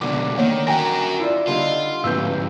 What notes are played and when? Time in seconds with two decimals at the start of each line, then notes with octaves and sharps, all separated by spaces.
0.01 C#2 B2 D3 D6
0.38 D#3 A#3 C#5 F#5
0.67 F#4 A#4 G5 G#5 A#6
1.20 E4 F4 D5
1.47 D3 G3 D#4 F4
2.04 A1 D2 G#2 E3 E6 G6